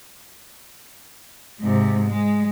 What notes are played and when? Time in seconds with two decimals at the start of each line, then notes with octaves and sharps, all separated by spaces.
1.61 G#2 C3
2.06 G#3